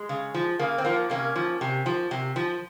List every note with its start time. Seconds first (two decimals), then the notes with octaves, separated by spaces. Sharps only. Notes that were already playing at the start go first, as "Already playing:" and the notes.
Already playing: G#3
0.09 C#3
0.34 F3
0.59 C#3 A#3
0.78 C4
0.84 F3 A#3
1.10 C3 A#3 C#4
1.36 F3
1.61 C3
1.86 F3
2.11 C3
2.36 F3